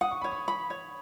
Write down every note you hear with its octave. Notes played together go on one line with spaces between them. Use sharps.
F#5 D#6
C#6
C#5 B5
C#6
B5
C#5